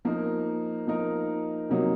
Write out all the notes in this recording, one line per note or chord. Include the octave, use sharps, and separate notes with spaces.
F3 A#3 D#4 A#4
F3 A#3 D#4 A#4
C3 F#3 A#3 D#4